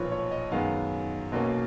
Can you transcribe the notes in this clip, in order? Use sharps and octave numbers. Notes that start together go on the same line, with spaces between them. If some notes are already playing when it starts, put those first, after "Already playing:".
Already playing: B1 A#2 F3 B4 C#5
C#5
D#5
F#2 D#3 G#3 B3 F5
B1 B2 A#3 C#4